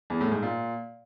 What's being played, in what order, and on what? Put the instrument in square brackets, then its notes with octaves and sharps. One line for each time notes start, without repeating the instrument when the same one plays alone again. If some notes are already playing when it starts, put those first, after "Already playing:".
[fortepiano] E2
A2
G#2
A#2